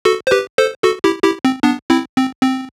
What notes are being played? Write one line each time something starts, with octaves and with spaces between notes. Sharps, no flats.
F#4 A4
C5
G4 B4
A4 C5
F#4 A4
E4 G4
E4 G4
C4
B3 D4
C4 E4
C4
C4